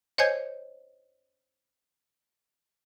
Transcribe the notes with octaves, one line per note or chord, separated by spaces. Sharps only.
C5 C#5 D#5 G#5 G6 G#6